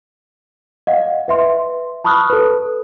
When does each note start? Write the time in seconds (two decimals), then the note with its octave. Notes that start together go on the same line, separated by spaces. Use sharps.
0.87 D#5 F5 F#5
1.28 B4 E5 C6
2.04 A5 B5 C#6 D#6 F6 F#6
2.30 A4 B4